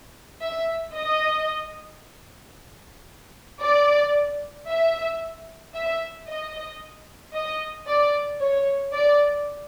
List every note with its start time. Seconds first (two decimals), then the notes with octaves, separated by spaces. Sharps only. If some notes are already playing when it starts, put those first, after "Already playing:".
0.42 E5
0.95 D#5
3.61 D5
4.68 E5
5.74 E5
6.27 D#5
7.33 D#5
7.87 D5
8.40 C#5
8.93 D5